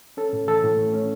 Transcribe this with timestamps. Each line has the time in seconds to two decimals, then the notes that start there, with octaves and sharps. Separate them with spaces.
0.17 C#4 A4
0.33 A2
0.48 E3 A4
0.64 A2
0.78 A3
0.94 C#4